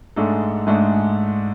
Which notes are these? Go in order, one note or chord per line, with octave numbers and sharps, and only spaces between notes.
G#2 G#3 A3 D4 A4
G#2 G#3 A3 D4 A4